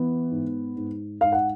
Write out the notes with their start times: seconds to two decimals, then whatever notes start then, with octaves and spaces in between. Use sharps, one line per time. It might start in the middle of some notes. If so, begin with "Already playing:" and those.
Already playing: E3 B3
0.31 G#2
0.76 G#2
1.20 G#2 F5
1.32 F#5